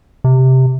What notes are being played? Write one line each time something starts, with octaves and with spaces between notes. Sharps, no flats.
C3